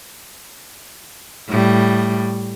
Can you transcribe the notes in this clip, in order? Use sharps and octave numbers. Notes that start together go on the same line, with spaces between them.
A2 G3